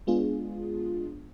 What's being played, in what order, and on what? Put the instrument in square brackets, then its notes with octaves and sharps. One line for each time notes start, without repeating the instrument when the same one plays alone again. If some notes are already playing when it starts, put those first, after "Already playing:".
[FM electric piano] G#3 B3 D4 F4 G#4